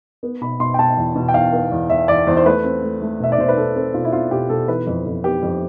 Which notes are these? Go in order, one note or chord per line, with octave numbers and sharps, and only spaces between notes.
B3
B2 B5
B2 C6
G5
B2 A5
E2
B2
G5
E2 F5
B3
E2
E2 E5
E2 D5
E2 C5
C5
A3 B4
C4
A3
A3
B2 E5
D5
B2 C5
B4
B2 A4
C4 A4
B2 F4
E4
C4 F4
B2 G4
B2 A4
E3 B4
F2
F2
B3 G4
F2